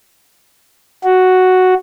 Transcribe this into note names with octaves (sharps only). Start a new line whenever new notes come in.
F#4